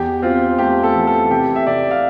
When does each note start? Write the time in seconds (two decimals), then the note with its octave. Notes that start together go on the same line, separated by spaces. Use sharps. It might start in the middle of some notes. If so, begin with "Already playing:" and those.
Already playing: E2 G4
0.22 C4 F4
0.58 A3 G4
0.83 A4
0.95 E3
1.07 A4
1.30 C3 G4
1.56 E5
1.67 C3 D5
1.91 F5